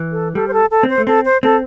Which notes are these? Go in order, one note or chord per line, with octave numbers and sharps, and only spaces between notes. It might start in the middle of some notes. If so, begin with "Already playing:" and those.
Already playing: E3
A4
G3 A4
C5
A4
A4
C4
C5
A3
C4 A4
C5
C4 A4